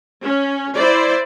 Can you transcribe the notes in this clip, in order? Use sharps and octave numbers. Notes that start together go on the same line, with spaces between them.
C#4
E4 C5 D5